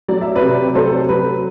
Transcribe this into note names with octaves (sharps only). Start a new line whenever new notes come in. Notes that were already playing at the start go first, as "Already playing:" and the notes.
F#3 D5
E5
B4 D5
C3
F#3 A4 C5
F#3 B4